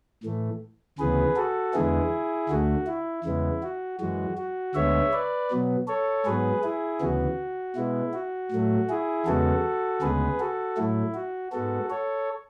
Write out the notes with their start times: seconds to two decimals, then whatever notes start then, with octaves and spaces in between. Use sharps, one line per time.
0.24 A2 E3 A3
0.99 D2 C#3 E3 B3 G#4 B4
1.36 F#4 A4
1.74 E2 D3 G#3 B3 E4 G#4
2.49 D2 D3 A3 F#4
2.87 E4
3.24 E2 C#3 G#3 B3 E4
3.63 F#4
4.00 F#2 E3 G#3 F#4
4.37 F#4
4.75 D2 D3 G#3 B3 C#5 E5
5.13 B4 D5
5.50 B2 F#3 B3
5.88 A4 C#5
6.25 G#2 F#3 B3 G#4 B4
6.63 E4 G#4
7.01 D2 C#3 E3 B3 F#4
7.76 B2 G#3 B3 E4
8.14 F#4
8.52 A2 F#3 A3
8.89 E4 G#4
9.26 E2 C#3 G#3 B3 F#4 A4
10.01 D2 C#3 G#3 B3 G#4 B4
10.40 F#4 A4
10.77 A2 F#3 A3 E4
11.14 F#4
11.52 G#2 G#3 B3 F#4 A4
11.90 A4 C#5